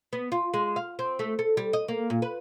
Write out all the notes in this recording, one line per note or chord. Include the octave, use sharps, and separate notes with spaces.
B3
F4
G#3
F5
C4
A3
A4
G3
D#5
A#3
A#2
B4